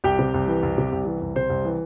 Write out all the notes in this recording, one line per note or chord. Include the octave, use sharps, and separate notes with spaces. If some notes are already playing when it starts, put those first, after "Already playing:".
C2 G4 G5
C3
C2
E3
C2
C3
C2
E3
C2
C3 C5 C6
C2
E3